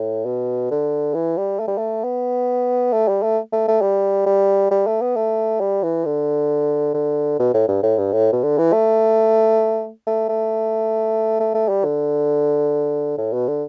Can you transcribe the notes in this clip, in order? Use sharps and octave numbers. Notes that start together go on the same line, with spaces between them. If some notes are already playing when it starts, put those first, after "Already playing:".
Already playing: A2
B2
D3
E3
G3
A3
G3
A3
B3
A3
G3
A3
A3
A3
G3
G3
G3
A3
B3
A3
G3
E3
D3
D3
B2
A2
G2
A2
G2
A2
B2
D3
E3
A3
A3
A3
A3
A3
G3
D3
A2
B2
D3